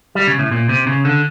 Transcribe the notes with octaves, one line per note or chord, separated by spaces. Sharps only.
G3
C#3
A2
A#2
C3
C#3
D3